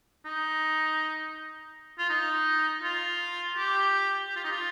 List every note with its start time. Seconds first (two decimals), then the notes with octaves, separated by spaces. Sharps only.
0.25 D#4
1.98 F4
2.10 D#4
2.83 F4
3.57 G4
4.29 G4
4.36 F4
4.44 D#4
4.51 F4